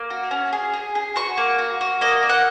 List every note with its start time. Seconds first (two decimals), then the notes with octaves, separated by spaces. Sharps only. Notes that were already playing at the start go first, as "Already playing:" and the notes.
Already playing: A#3
0.10 F#4
0.31 C#4
0.53 G#4
0.73 G#4
0.95 G#4
1.16 F#4 C#6
1.37 A#3
1.59 F#4
1.81 F#4
2.01 A#3 D#5
2.23 A#3
2.29 F#5